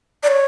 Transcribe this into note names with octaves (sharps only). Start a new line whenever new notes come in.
D5
C#5